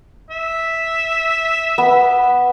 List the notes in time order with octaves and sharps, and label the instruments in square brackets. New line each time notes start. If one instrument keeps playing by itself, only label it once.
[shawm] E5
[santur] B3